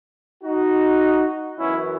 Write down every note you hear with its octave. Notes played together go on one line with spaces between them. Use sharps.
D#4 F#4
F#2 E3 B3 C#4 E4